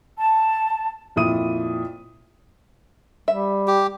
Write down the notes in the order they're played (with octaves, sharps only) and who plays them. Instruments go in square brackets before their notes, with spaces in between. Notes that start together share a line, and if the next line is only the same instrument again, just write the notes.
[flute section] A5
[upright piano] F2 A#2 E4 D#6 D#7
[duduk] G3 [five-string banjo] E5
[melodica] G4